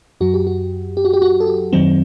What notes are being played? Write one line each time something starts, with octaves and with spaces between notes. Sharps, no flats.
F#2 F#3 F#4
G4
F#4
G4
F#4
G4
F#4
A4
G4
F#2 D#3 F#3 C4